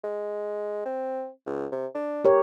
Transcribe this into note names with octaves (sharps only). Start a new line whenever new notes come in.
G#3
C4
C#2
C3
D4
G4 A#4 C#5